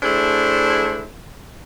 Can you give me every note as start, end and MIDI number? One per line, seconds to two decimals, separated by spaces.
0.03 1.06 57
0.03 1.06 62
0.03 1.06 64
0.03 1.06 68
0.03 1.06 72